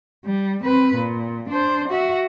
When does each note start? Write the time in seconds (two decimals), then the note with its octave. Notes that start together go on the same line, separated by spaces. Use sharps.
0.25 G3
0.64 C4 B4
0.96 A#2
1.50 D4 C5
1.89 F#4 E5